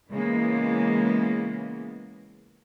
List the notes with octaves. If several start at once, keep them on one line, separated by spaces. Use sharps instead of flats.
C#3 E3 G#3 A#3 B3